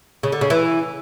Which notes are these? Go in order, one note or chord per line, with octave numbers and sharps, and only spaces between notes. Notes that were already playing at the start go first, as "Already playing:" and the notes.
C#3
D3
C#3
E3